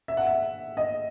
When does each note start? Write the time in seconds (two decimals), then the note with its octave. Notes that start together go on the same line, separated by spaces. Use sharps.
0.08 E5
0.17 F#5
0.27 E5
0.77 D#5